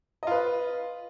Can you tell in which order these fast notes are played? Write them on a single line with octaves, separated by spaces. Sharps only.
D#5 F4 B4